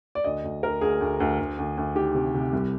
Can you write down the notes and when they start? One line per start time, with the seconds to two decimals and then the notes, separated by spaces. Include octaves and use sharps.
0.15 D5
0.24 D2 D#5
0.44 D2
0.63 D2 A#4
0.81 D2 G#4
1.01 D2
1.20 D2
1.39 D2
1.58 D2
1.77 D2
1.95 D#3 G4
2.15 C3
2.34 C3
2.53 C2